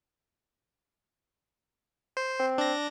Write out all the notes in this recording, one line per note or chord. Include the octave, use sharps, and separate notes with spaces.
C5
C4
D4 A#6